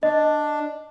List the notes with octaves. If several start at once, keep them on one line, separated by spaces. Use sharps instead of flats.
D4 D#5